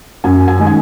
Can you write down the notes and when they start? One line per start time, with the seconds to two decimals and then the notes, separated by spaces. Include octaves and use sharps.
0.24 F#2 G#5
0.48 G#5
0.59 D#3 G#3
0.67 G#5